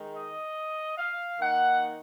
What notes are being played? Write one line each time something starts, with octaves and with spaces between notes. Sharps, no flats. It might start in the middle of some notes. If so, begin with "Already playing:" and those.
Already playing: D#3 G#3 D#4
D#5
F5
D#3 A#3 D#4 F#5